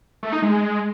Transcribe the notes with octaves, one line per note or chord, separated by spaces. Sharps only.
A3
D#4
G#3